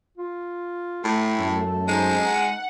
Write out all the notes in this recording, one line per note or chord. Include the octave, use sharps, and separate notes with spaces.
F4
A2 A3 A4
F#2
G#3 D#4 C5
F#5